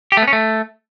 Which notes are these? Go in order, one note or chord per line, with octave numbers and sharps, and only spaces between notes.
G4
A3
B3
C#4
A3